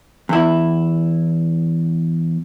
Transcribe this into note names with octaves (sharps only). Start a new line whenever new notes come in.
E2 E4